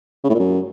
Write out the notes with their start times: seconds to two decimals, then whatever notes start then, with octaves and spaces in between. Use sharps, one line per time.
0.24 C#3
0.29 A2
0.34 A#2
0.39 F#2